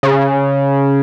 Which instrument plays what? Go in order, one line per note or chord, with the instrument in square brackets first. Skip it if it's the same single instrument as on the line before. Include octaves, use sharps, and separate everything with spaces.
[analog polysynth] C#3